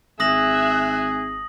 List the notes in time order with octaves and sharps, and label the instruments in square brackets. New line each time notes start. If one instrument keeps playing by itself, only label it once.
[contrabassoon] G#1 [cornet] G#4 [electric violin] E5 F#6 [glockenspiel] D#6 A#6 F#7